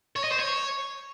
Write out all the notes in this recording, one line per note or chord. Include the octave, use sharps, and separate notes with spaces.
C#5
D#5
C5
C#5